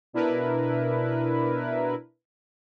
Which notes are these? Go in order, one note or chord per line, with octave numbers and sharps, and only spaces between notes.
B2 D4 E4 A#4 B4